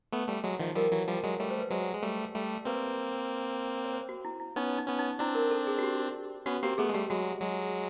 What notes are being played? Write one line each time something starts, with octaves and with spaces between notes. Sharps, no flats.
A3 B3
G3 A3
F#3 G#3
D#3 F3
F3 G3 A#4
E3 F#3
F3 G3
F#3 G#3
G3 A3 C#5
C5
B4
F#3 G#3 C5
G#3
G3 A3
G3 A3
A#3 C4 B4
C#5
C5
F#4
E4
E4
B3 C#4 D#4
D#4
B3 C#4
D#4
C4 D4 E4
A#4
A4
G#4
F#4
G4
B3 C#4 F#4
A#3 C4 G4
A3 B3 G#4
G#3
G3 A3 G4
F#3 G#3 F#4
F#3 G#3